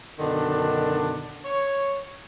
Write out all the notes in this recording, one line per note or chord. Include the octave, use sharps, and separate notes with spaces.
F#2 B2 D3 D#3 D4
C#5